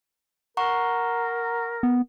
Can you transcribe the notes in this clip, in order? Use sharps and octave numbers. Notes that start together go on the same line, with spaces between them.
A#4 F#5 A#5 C#6
B3